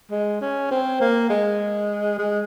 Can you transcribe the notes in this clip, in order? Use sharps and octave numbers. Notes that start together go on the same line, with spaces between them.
G#3
C#4
C4
A#3
G#3
G#3